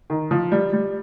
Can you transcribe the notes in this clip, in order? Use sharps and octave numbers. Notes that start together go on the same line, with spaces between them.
D#3
F3
G3
G3